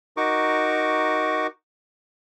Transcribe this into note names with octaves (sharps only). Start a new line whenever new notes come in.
D#4 F#4 A#4 C#6 D6